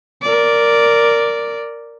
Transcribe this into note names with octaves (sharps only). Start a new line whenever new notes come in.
A#4 D5